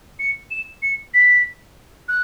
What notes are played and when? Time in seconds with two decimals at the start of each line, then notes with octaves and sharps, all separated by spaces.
0.20 C#7
0.51 E7
0.82 C#7
1.14 B6
2.09 F#6